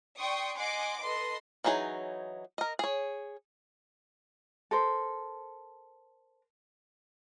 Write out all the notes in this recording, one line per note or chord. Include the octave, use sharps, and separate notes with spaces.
D5 G5 C6 C#6 D#6
D#5 F#5 G#5 C6 D6
A4 B4 D#5 C6
E3 F#3 D#4 G#4 C#5
A#4 D#5
G#4 C#5
A4 A#4 C5